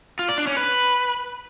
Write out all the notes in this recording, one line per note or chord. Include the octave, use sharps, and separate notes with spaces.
F4
D5
D4
C#4
B4